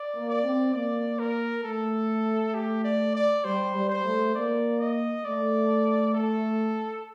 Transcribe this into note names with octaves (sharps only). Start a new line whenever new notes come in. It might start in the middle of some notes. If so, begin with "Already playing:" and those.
Already playing: D5
A#3
D5
C4
A#3 D5
A#4
A3 A4
G4
D5
D5
G3 C5
G3
C5
A3
A#3 D5
D#5
A3 D5
A4